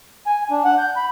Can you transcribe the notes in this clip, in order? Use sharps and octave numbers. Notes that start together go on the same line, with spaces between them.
G#5
D4
F#5
G6
B5